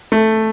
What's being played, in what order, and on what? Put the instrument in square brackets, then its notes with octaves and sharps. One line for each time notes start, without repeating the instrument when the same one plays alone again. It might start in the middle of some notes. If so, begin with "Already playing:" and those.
[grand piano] A3